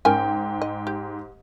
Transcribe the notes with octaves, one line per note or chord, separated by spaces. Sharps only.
G#2 C#4 A#4 G5 G#5
D#5
G4